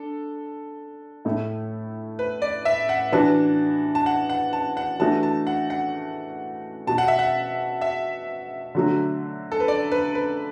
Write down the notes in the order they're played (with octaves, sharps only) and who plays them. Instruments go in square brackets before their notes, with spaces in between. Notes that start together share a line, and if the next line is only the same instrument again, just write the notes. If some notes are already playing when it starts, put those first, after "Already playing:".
Already playing: [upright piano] D4 [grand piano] A4
[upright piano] A2 A3 E4
[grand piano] B4
D5
E5
F#5
[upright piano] E3 B3 D4 F#4 [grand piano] A5
[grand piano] A5
F#5
F#5
A5
F#5
[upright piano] E3 A3 D4 F#4 [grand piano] A5
[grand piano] A5
F#5
F#5
[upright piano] B2 B3 F#4 [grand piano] A5
[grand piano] F#5
E5
F#5
E5
[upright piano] D3 F#3 A3 F#4
[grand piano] A4
B4
D5
B4
B4